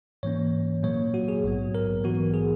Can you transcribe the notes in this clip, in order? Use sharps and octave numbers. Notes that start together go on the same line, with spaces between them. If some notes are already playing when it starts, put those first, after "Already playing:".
G#2 E3 A#3 C#4 C#5
A#2 F#3 A#3 C#5
F#4
G#4
A#1 G#2 F#3 B3
A#4
A#1 G#2 E3 B3 F#4
G#4